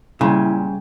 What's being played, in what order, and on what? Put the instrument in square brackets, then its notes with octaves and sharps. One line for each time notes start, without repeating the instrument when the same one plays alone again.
[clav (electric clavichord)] A#2 [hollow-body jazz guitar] C#3 [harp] G3 G5 G#5 [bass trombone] E4